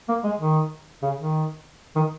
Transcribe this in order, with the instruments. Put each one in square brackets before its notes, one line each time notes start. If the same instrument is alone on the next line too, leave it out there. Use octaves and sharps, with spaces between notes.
[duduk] A#3
G#3
D#3
C#3
D#3
D#3